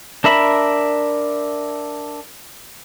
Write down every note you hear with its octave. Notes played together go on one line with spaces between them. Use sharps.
D4 A#4 E5 B5